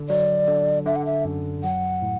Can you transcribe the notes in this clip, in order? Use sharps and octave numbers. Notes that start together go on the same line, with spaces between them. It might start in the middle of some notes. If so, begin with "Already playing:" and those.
Already playing: D3
F#3 D5
D3
D3 E5
F#5
E5
F#2
F#3 F#5
A2